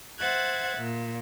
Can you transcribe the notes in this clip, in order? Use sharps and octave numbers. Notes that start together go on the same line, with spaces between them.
C5 E5 F#5 F#6 G#6 A6
A#2